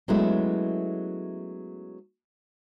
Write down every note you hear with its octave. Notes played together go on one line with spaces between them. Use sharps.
F#3 G#3 A3 B3 C#4 E4